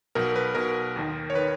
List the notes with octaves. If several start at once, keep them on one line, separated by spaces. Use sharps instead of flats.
B1 B2 A#4
B4
B1 B2 A#4
D#2 D#3
C#5
D#3 B4